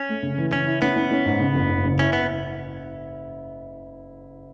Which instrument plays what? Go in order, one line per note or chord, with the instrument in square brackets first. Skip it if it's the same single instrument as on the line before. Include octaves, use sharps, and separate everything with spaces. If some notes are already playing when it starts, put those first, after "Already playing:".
Already playing: [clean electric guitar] C#4
[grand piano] A3
C#3
E3
[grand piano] C#3 [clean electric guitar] C#4
[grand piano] E4
[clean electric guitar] B3 [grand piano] C#4
[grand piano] C#4
C#4
G#2
C#3
F#1
C#3
C#3
[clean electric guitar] C#4 [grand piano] E4
[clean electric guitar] B3